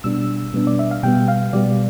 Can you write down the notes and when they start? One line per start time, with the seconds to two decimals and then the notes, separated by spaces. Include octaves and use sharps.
0.04 B2 G3 B3 D4 E6
0.53 B2 G3 B3 D4
0.67 D5
0.79 E5
0.91 F5
1.03 B2 G3 B3 G5
1.28 F5
1.53 B2 G3 B3 D5